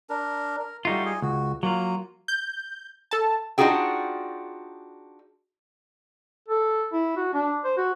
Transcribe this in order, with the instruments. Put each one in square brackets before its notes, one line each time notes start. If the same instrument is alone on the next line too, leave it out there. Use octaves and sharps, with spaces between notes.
[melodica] D4 A#4
A#4
[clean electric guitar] G3 D#4 F4 [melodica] A3 F#4
[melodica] G#4
[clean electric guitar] C#2 [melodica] F#4
[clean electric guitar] F#3 F4 [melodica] A#3
[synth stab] G6
A4 A5
[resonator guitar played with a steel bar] D4 D#4 F4 F#4 G#4 G5
[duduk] A4
E4
F#4
D4
C5
F#4